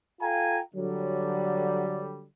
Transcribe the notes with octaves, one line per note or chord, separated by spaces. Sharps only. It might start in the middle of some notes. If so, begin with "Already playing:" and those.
F4 A4 F5 G5 G#5 A#5
D3 F#3 G3